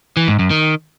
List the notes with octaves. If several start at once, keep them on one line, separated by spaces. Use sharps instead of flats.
E3
G#2
F#2
D#3